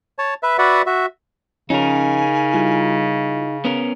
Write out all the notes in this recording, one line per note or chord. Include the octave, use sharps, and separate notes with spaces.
C#5 A5
B4 E5
F#4 B4 D5 E5 F#5
F#4 E5
C#3 F3 C#4 D#4 A#4 G#5
G3 E4 F4
B3 C#4 A#4